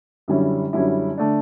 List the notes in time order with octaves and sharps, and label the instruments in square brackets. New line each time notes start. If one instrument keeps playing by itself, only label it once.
[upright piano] F#2 D3 G3 C#4 E4
F#2 D3 G3 C#4 E4
D3 A3 D4